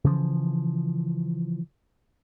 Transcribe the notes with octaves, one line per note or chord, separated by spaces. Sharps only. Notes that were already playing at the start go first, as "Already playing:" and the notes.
C#3 E3 F3